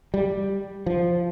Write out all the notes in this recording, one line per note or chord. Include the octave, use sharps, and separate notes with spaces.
G3
F3